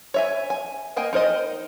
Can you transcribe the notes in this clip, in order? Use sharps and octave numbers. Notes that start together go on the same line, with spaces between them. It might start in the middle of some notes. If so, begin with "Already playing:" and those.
C#5 E5 G#5
G#5
A#3 D#5 G5 G#5
D#4 A#4 C5 D#5